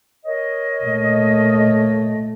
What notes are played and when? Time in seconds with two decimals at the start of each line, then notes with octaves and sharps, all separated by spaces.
0.25 A#4 C#5 D#5
0.84 A#2 A3